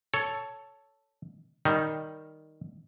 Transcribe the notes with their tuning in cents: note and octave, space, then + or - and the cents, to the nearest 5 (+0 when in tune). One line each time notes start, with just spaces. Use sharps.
A4 +0 C#5 +10
D#3 +0 G3 +0 D#4 +0